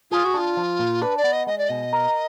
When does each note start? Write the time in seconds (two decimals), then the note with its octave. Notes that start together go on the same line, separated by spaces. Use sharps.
0.11 F4 G#4
0.24 F#4
0.34 D4 F4
0.57 F3
0.79 A#2
1.02 D4 B4
1.17 D5
1.24 B3
1.32 D#5
1.47 G#3 D#5
1.58 D5
1.69 B2 D#5
1.93 A#4